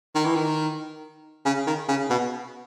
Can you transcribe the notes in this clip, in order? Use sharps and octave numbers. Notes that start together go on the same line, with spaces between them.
D#3
E3
D#3
C#3
D#3
C#3
B2